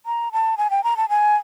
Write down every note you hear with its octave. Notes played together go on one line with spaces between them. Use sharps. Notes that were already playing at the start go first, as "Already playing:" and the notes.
A#5
A5
G#5
G5
A#5
A5
G#5